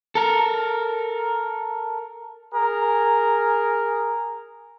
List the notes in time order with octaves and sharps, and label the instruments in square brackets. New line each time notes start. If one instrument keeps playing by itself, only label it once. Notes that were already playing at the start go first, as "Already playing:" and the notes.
[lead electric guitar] A4 A#4
[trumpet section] G#4 A#4